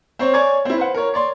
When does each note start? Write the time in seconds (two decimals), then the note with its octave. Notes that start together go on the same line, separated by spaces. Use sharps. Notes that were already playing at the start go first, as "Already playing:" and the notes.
0.19 C4 C5 C#5
0.33 C#5 D5 G#5 C#6 G#6
0.65 C4 E4
0.78 B4 C5 F#5
0.95 A#4 C#5
1.14 C#5 D5 C6